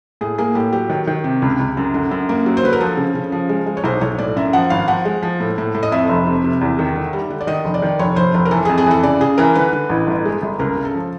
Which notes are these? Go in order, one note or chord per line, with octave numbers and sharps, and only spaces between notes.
A2 G#4
A#3 G#4
A2 G4
F#3 G4
D#3
D#3
C3
C#2
C#2
F#2
D3
F#2
A#3
F#3
C5
D3 B4
A#4
F3 A4
C#3
C#3
F3
G#3
G#3
C#5
B1 C5
B1 C#5
A2 D5
F#2 E5
F3 F#5
G#1 F5
F3 F#5
G#3
F3
A2
A2
A2
D#5
F2 E5
F1
C3
C3
E2
D#3
D3
G3
D3
D5
D#3 D#5
F1
D5
D#3
F1 C#5
F1 C5
F1
A#4
E3 A4
G#4
F2
G#4
E3 A4
C#3 D5
C#3 G#4
E3 A#4
D3 B4
D3
A1
G1
G#3
G1
C#2 A#4
C#3
A4
F3